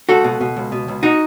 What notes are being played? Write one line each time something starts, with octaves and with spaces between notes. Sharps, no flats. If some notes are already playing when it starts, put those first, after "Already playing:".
C#2 F#4 A4
B2
B2
C#2
B2
C#2
D#4 F#4